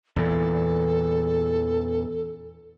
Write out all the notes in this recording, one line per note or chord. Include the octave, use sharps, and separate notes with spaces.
E2 A#2 E3 A4